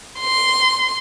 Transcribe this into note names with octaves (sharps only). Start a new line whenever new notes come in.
C6